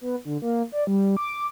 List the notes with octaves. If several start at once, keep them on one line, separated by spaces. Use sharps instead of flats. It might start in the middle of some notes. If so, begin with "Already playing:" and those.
B3
D3
A#3
D5
G3
D6